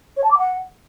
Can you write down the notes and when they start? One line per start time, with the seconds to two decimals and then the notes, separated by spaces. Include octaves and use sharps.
0.16 C#5
0.23 A5
0.30 D6
0.37 F#5